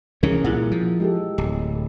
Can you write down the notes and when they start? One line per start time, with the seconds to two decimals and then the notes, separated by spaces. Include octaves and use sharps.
0.23 C2 E3 C#4 G#4 A#4
0.44 A#2 G3 E4 F#5
0.72 F3
1.00 G#3 G4 A4
1.38 D1